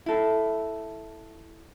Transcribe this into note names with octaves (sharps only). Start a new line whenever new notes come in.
E4 A4